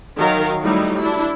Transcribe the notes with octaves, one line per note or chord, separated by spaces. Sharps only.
D#3 F#3 A#4 F5
F#3 G3 A3 D#4 E4
D4 E4